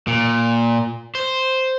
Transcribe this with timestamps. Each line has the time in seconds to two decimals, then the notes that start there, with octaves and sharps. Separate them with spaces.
0.07 A#2
1.15 C5